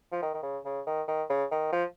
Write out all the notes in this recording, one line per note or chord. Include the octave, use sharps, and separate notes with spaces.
F3
D#3
D#3
C#3
C#3
D#3
D#3
C#3
D#3
F3